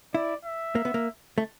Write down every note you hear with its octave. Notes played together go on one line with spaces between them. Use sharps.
E4 D5
E5
A#3
B3
A#3
A3